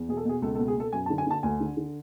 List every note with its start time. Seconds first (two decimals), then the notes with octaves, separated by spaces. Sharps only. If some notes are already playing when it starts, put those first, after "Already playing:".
Already playing: E2
0.09 B2 G#4
0.17 A4
0.25 B2 G#4
0.42 C#2 A4
0.55 A4
0.59 B2
0.68 G#4
0.76 B2 A4
0.92 F#2 G#5
1.06 A5
1.10 D3
1.18 G#5
1.27 D3 A5
1.43 D2 G#5
1.60 D3
1.77 D3